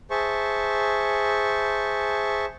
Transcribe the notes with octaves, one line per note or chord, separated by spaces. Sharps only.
G#4 C5 E5 A5 C#6